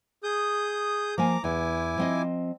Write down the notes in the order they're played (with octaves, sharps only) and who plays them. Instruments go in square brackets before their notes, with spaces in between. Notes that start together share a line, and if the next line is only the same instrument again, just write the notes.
[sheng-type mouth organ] G#4 D#6 G6
[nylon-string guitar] F3 A#3 G#5 [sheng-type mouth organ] A#5 D6
[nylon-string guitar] E2 [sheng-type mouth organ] E4 G#5 D6
[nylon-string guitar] F3 C4 D#5